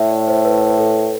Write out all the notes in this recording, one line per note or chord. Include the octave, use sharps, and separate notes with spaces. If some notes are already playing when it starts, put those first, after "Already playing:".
Already playing: A2 E5
D5
C5
B4
B4
A4